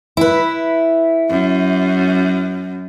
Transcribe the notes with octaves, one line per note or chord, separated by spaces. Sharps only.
E4 B4
F#2